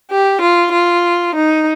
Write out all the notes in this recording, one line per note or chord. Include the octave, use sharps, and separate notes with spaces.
G4
F4
F4
D#4